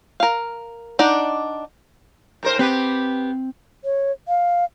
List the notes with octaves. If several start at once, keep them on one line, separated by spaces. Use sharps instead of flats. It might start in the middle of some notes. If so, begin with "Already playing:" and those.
A#4 F5
D4 D#4 D5 F#5
G#2 A#4 C5
B3 C4 G4 B4
C#5
F5